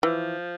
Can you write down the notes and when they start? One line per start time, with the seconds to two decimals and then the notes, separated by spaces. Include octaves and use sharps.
0.03 E3 F3